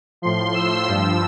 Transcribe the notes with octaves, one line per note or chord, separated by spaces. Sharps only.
A2 F3 C6
E6
G2 F3 E6